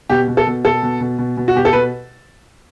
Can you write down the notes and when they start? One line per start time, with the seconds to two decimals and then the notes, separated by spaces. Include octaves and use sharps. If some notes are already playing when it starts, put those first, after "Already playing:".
0.10 B2 G4
0.28 B2
0.37 A4
0.47 B2
0.64 B2 A4
0.83 B2
1.01 B2
1.18 B2
1.37 B2
1.48 F#4
1.55 B2 G4
1.65 A4
1.73 B2 B4